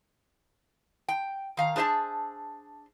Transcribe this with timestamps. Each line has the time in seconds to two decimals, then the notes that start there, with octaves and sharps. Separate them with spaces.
1.08 G5
1.57 D#3 F5 A#5
1.76 D4 G#4 C5 E5 A5